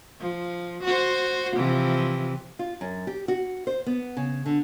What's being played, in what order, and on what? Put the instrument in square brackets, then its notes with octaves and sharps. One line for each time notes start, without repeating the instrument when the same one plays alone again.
[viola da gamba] F3
F#4 C5
C3 E3 F3
[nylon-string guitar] F4
F#2
G4
F#4
C5
B3
C#3
D3